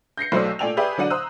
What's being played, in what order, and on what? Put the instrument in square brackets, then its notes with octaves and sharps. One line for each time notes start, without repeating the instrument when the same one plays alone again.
[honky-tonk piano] G6 A#6 C7 C#7
B1 F#3 A3 C5 D5 E6
A#2 A3 D5 G5 G#5 F7
G4 G#4 B4 D5 E5 G6
D3 F#3 D5 F#5 D#7
C5 A#5 D#6 E6 F#6